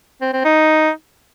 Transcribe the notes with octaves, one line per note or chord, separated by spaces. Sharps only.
C4
C4
D#4